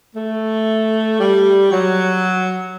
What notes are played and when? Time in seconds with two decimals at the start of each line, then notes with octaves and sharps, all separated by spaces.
0.15 A3
1.20 G3
1.71 F#3